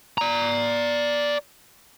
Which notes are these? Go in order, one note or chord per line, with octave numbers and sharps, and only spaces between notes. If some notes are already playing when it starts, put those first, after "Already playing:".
D5 A#5